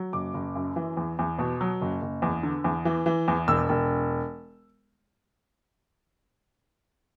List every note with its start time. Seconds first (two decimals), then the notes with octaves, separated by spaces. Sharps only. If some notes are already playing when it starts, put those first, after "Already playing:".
Already playing: F#3
0.13 F#1 D6
0.34 F#1
0.55 F#2
0.76 E3
0.97 E2
1.19 E2
1.39 B2
1.61 F#3
1.82 F#1
2.02 F#1
2.22 E2
2.43 D3
2.64 E2
2.85 E3
3.06 E3
3.28 E2
3.48 E1 E6
3.69 E1